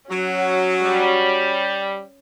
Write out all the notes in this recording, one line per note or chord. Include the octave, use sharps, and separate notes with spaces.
F#3 C#4 F#4
G3